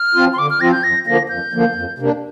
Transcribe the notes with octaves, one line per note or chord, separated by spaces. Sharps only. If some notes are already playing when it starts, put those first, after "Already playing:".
Already playing: F6
F3 C4 F4
C6
D3 D6
F6
F3 C4 F4 A#6
G6
F2 A#6
D3 F3 A#3 A#6
F2 G6
D3 F3 A#3
F2
C3 A#3 D4